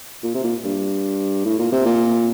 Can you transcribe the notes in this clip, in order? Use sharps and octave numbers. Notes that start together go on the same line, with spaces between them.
A#2
C3
A#2
G2
A2
A#2
C3
A#2